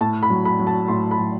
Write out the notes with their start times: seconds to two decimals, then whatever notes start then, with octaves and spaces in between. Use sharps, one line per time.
0.01 A2 A5
0.23 B5
0.30 F#3
0.45 B5
0.60 F#3
0.67 A5
0.88 A2 C6
1.11 B5
1.18 F#3